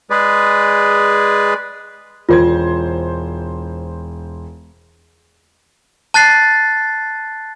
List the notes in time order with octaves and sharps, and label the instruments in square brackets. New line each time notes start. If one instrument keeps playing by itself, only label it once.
[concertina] G#3 G#4 B4 D5
[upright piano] E1 C5 G#6 [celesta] F4
[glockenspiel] A5 F#6 A6 C7